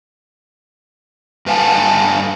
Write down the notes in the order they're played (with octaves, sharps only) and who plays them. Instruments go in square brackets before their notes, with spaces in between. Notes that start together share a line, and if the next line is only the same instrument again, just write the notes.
[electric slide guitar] G2 B4 F5 G#5 A5